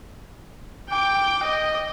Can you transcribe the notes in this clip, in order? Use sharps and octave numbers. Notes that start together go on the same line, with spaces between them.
G5 D6
D#5